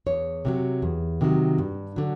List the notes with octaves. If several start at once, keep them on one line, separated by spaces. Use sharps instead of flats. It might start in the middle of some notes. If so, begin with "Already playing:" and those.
E2 C#5
C3 D#3 F#3
E2
C3 D#3 F#3
G2
D3 F#3